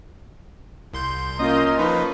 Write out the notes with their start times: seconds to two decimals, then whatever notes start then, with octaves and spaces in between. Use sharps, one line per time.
0.93 C2 C6 G6
1.39 A#3 C#4 F4 A#4 D#5
1.79 F3 D#4 B4